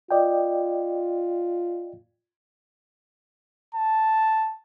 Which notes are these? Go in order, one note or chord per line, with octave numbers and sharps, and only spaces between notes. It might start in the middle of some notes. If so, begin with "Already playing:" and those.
F4 D5 D#5 G5
A5